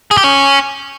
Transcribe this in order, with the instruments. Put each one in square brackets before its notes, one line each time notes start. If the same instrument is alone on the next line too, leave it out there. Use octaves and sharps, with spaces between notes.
[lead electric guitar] G#4
G4
C#4